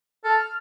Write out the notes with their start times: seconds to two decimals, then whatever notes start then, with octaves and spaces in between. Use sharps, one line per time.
0.24 A4 F6